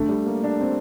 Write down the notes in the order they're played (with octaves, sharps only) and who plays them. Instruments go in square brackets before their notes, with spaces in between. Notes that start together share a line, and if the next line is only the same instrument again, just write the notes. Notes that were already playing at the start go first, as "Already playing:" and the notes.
Already playing: [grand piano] A3 [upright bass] D4
[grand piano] G3
A#3
D4
C4